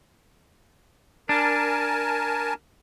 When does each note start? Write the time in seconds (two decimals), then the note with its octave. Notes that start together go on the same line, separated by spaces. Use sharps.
1.29 D4 A#4 G#5 A5